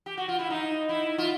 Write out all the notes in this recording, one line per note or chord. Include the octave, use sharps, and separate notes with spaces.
G4
F#4
F4
E4
D#4
E4
F4